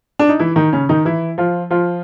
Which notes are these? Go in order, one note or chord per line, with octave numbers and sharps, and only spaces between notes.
D4
D#4
E3 E4
D#3 D#4
C#3 C#4
D#3 D#4
E3 E4
F3 F4
F3 F4